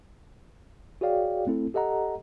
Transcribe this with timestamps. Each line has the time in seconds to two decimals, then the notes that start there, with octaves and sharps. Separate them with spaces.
1.01 F#4 G#4 C#5 D5 F5 G5
1.47 A3 C4 E4 A4
1.74 G4 A4 D#5 F#5 A#5